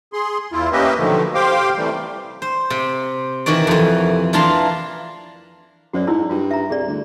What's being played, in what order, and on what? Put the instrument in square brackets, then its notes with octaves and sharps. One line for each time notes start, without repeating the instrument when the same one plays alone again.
[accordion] G#4 C6
E2 E4 F4
A#3 C#4 G4 B4 D#5 E5
B2 D3 D#3 F3 F#3 A3
G4 C5 F5 G5 C6 D6
C3 E3 G3 A3
[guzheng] C5
C3
D#3 E3 F#4 D5
F2 E3
E3 D4 F4 A5 A#5 C6
[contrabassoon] F#2 [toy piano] F#4 C5 D5
[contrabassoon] G#2 [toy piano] D#4 E4 E6
[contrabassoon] G2 [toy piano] F4
[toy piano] E5 A#5
[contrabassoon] C2 [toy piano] G#4 D5
[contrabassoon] D2